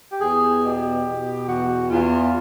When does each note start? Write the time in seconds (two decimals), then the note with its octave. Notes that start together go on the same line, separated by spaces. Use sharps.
0.11 G4
0.21 E2 G#4
0.63 B2 G4
1.06 B2
1.48 E2 F#4
1.90 E2 F4